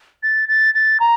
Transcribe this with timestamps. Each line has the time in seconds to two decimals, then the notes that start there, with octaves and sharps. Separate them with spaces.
0.23 A6
0.49 A6
0.74 A6
1.00 A#5